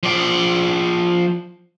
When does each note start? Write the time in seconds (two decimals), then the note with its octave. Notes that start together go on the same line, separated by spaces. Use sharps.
0.03 F3 D5